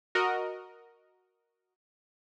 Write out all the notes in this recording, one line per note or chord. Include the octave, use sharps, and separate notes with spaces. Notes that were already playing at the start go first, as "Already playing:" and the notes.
F#4 A#4 D#5